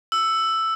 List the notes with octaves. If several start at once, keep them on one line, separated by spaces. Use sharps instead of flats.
E6